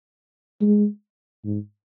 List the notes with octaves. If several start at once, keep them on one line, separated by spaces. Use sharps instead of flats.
G#3
G#2